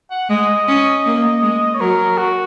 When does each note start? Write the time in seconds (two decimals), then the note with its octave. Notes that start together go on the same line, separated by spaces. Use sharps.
0.11 F#5
0.29 G#3 D#5
0.68 C#4
1.06 A#3
1.42 G#3
1.75 C#5
1.80 F#3 A#4
2.18 F#4